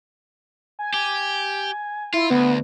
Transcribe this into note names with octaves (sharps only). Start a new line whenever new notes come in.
G#5
G4 G#5
E4 F4
D2 B3